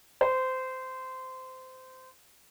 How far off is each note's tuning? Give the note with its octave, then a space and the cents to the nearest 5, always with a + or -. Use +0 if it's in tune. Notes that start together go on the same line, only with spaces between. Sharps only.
C5 -20